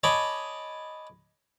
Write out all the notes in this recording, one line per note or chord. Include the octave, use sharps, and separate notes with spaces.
C#5 D#5 G#5 A5 B5 D6